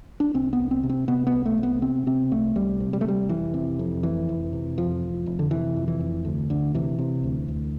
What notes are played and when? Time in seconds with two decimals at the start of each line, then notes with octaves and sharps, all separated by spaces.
0.20 D4
0.34 C2 C4
0.53 B3
0.59 C2
0.71 C4
0.83 C3
0.89 C4
1.08 C3 B3
1.27 B3
1.32 C2
1.46 A3
1.58 C2
1.63 B3
1.82 C3 C4
2.06 C3 C4
2.31 C2 A3
2.56 C2 G3
2.80 C3
2.93 G3
3.01 A3
3.05 C3 G3
3.29 F1 E3
3.54 C3
3.79 F2
4.03 F1 E3
4.29 F1
4.53 C3
4.78 F2 F3
5.02 F1
5.26 F1
5.39 D3
5.51 C3 E3
5.76 F2
5.88 E3
6.00 F1
6.25 D2
6.50 D2 D3
6.74 C3 E3
6.99 C3
7.24 D2
7.48 D2